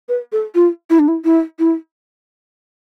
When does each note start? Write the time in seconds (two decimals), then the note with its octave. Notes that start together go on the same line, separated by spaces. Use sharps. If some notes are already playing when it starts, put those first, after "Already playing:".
0.09 B4
0.32 A4
0.55 F4
0.90 E4
0.99 D4
1.08 E4
1.25 E4
1.59 E4